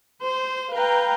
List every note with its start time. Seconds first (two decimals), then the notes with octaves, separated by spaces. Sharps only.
0.22 C5
0.74 B4 F5 G5 A#5